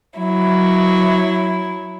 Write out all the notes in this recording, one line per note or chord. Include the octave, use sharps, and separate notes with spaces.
F#3 E4